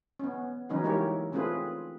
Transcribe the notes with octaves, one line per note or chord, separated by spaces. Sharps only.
B3 C#4
E3 F#3 C#4 D#4 B4
G#3 A#3 E4 G4 A#4 C#5
A3 C4 C#4 F4 G#4 B4